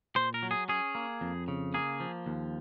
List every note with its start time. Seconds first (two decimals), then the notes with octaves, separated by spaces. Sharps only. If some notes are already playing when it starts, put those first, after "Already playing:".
0.16 A#2 C5
0.34 A#4
0.43 F#3
0.51 G#4
0.68 C#4 G#4
0.95 A#3
1.21 F2
1.48 C#3
1.74 A#3 G#4
2.00 F3
2.26 D#2